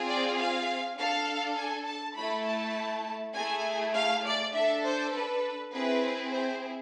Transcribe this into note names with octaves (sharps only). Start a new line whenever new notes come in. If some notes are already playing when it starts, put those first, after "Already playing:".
Already playing: C4 F4 G#4
D5
F5
D4 A4 F5
G#5
A5
A3 E4 A4 B5
A5
A3 E4 G#4 G#5
F5
D5
D4 A4 E5
C5
B4
C4 E4 G#4 B4
C5